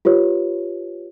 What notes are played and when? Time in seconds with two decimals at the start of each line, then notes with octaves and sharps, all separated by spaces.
0.05 F4 G4 B4 C#5